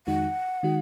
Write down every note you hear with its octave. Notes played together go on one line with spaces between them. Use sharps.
F2 D#3 G#3 D#4 F#4 F#5
D#3 G#3 D#4 F#4